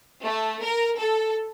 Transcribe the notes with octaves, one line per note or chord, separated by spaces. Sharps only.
A3
A#4
A4